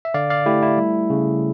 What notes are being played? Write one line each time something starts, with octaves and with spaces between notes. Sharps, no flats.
E5
D3 D5 F5
D5 F5
A3 E4 G4
E4
G3
C#3